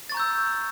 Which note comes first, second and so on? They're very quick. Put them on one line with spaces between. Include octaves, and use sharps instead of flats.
A6 C#6 A#5 G6 E6